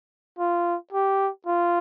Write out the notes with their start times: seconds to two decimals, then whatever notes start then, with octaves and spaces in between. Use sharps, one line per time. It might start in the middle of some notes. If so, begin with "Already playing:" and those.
0.39 F4
0.93 G4
1.47 F4